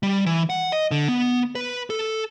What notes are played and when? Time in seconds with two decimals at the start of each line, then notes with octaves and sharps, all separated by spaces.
0.03 G3
0.26 E3
0.50 F#5
0.72 D#5
0.91 D3
1.08 B3
1.55 B4
1.90 A4